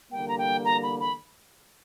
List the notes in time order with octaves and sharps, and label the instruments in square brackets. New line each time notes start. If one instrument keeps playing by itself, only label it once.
[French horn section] E2 D3 G3 A#3 [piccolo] G5
[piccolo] A#5
G5
A#5
B5
B5